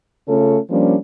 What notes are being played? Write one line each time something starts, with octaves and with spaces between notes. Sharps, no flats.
C#3 A3 C#4 F4 A4
F3 G3 A#3 C#4 D4